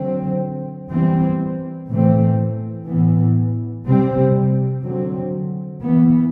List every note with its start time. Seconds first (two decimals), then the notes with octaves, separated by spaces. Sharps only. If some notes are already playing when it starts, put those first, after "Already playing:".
Already playing: D3 F#3 C4
0.91 E3 G3 C4
1.89 A2 E3 A3 C4
2.87 A2 E3 B3
3.86 C3 G3 C4
4.84 D3 F#3 C4
5.82 E3 B3